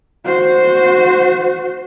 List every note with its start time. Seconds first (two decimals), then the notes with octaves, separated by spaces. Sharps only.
0.24 F#4 C5